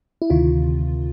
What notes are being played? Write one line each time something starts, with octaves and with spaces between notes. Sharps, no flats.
E4
D2 C3 D#3 F4